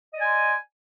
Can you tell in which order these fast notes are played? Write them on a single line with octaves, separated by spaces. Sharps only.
D#5 D5 G#5 C6